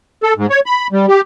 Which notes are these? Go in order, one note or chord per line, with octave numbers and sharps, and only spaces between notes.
A4
G#2
C#5
B5
G3
G4